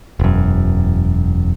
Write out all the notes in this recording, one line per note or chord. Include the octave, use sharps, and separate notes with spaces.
E1 F#2